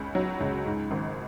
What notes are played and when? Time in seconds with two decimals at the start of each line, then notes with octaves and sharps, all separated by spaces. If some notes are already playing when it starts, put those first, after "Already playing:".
Already playing: C#2 C#3
0.15 F#3
0.40 C#2
0.66 G#2
0.91 G#1